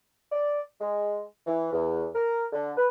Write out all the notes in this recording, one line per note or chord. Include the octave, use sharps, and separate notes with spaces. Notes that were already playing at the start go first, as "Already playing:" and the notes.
D5
G#3
E3
E2
A#4
D3
B4